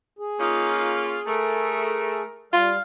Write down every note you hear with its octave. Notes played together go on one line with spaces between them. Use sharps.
G#4
A#3 C#4 D#4 F4
A3 A#4
G3 F4 F5